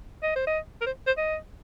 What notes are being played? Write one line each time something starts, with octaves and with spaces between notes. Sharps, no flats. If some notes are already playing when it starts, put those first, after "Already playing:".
D#5
C5
D#5
A#4
C5
C5
D#5